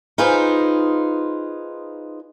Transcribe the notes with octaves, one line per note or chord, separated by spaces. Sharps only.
D#4 F4 G#4 B4 C5